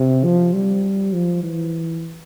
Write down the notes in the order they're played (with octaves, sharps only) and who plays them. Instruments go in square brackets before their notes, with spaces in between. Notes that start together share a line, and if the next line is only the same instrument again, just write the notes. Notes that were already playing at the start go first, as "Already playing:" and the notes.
Already playing: [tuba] C3
F3
G3
F3
E3